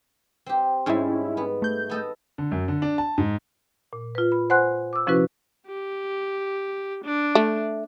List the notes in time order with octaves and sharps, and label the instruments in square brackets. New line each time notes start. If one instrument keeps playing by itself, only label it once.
[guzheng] C4 G4
[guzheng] G#2 G3 G#3 [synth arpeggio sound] C#4 E4
[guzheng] B3
[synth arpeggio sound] A3 G6
[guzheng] B3 A4 D#5
[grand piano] D3
F#2
D3
D4
A5
G#2
[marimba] A#2
F4 B4
B5
C5 F#5 G#5 C6 F#6
D6 E6
C3 F3 C#4 E4 F#4 B4
[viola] G4
D4
[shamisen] A3